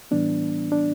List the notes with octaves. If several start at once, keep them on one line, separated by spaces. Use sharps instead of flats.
A2 E3 G3 B3 D4
D4